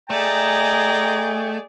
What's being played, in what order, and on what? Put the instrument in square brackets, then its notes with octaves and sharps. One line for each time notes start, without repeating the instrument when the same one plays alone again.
[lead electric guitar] A3 [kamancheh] G#4 D5 [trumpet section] D#5 G5 G#5 [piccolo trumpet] A#5